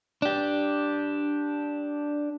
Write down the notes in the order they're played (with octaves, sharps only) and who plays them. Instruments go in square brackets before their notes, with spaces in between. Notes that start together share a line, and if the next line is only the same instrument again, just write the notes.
[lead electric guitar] D4 G4